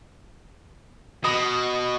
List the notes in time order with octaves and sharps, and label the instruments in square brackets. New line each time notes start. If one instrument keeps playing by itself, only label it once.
[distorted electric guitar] B2 [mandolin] D#5 B5 D#6